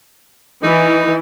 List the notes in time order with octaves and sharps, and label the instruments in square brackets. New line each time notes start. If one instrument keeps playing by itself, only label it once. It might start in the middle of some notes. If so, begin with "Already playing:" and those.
[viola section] E3 [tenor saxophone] D#4